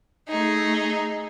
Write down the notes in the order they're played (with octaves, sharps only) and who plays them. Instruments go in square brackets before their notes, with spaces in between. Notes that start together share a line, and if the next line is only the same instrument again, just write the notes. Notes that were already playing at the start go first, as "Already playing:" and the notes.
[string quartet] A3 D#4 G#4